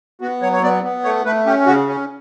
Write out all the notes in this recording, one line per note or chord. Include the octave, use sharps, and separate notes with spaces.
B3 F#4
F#3 C#5
C#5
B3 D5
B3
A3 C#5
A3 B4
C#4 G4
C#3 F#4
C#4